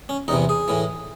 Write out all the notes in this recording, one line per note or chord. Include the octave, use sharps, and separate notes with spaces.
C#4
E2 C3 E3 D#4
G#4
A2 E3